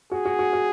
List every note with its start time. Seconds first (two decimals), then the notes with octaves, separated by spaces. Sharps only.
0.11 F#4 G#4
0.25 F#4
0.39 F#4
0.53 F#4